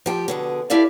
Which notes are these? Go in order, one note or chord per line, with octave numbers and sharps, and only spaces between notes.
F3 G4
B2 D3 G#4
E4 G4 A4 D5 F5